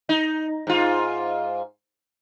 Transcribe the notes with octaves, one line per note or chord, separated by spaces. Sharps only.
D#4
G#2 F4